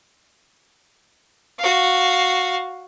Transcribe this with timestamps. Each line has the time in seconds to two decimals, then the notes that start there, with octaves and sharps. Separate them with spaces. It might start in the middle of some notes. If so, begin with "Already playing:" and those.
1.59 F#4 F5